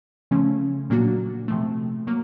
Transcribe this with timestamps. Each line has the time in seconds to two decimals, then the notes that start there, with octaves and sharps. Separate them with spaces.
0.31 C#3 F3 A3 C#4
0.90 A#2 F#3 A#3 D4 F#4
1.48 C3 F3 A3
2.07 F#3 A#3